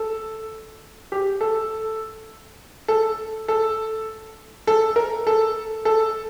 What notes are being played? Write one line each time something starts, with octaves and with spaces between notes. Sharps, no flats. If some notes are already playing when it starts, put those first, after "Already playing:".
Already playing: A4
G4
A4
A4
A4
A4
A#4
A4
A4